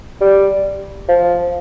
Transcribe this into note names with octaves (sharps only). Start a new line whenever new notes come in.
G3
F3